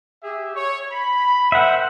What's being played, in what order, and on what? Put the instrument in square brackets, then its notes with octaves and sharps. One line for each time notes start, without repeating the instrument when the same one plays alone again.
[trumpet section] G4 G#4 E5
C#5
B5
[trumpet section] A#4 C5 G5 [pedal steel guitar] E5 F#5